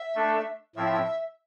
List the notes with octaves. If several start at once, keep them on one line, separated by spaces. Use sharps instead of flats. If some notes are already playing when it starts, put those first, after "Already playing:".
Already playing: E5
A3 D4 A4
A2 F3 C4 E4 E5